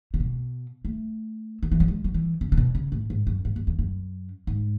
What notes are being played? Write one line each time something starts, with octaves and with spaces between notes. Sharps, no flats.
C#3
B2
A3
D#3
E3
F#3
G#3
F#3
E3
C#3
C#3
B2
C#3
A2
G#2
F#2
G#2
F#2
E2
F#2
G#2